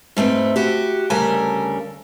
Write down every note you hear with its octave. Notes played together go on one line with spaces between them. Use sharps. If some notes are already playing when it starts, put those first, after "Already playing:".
G#2 A3 C4 B4
F#4 G4
D2 C#3 G3 A4 A#4 G#5